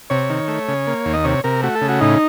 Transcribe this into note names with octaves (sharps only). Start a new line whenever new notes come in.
C3 C#5
D#3
A3
C#3
A#3
D#2
D#5
C3 C#5
C3 A#4
A3 F#4
A4
C#3
F#4
A2 D#4